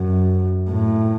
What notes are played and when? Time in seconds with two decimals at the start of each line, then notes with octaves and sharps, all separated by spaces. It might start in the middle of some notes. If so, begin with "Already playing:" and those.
Already playing: F#2
0.70 A2